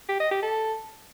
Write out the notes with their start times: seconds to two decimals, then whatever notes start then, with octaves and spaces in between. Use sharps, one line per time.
0.09 G4
0.20 D#5
0.31 G4
0.43 A4